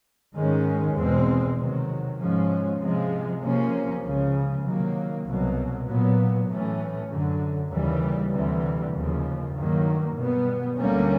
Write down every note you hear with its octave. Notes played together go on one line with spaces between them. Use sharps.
G#2 D#3 G#3 C#4
E2 B2 G#3 C4
C3 D#3 F#3
G#2 F3 G#3 C#4
C3 F3 G#3
C3 F3 A#3 C#4
C#2 C#3 F3
C3 D#3 F#3 A#3
C2 B2 F#3
A#2 F#3 B3
A2 E3 A3 C#4
F#2 D3 F#3
D#2 C#3 E3 G3
D2 C3 E3 G3
D#2 C#3 F3
G2 D#3 F#3 A#3
B2 G3 B3
D2 D3 G3 A#3 C#4